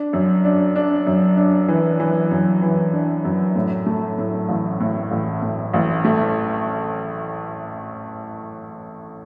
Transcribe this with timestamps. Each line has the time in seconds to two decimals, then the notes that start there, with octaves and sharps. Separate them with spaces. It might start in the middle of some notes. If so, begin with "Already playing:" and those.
Already playing: D4
0.13 F#2
0.44 D4
0.76 D4
1.07 F#2
1.37 D4
1.68 E3
2.00 E3
2.31 F#2
2.62 E3
2.93 D4
3.25 F#2
3.55 A2
3.86 A3
4.18 A2
4.49 A1
4.80 A2
5.11 A1
5.42 A2
5.73 A1
6.05 A3